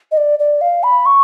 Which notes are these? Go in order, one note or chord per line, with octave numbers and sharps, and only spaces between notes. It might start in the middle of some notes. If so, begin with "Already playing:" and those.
D#5
D5
D5
F5
B5
C#6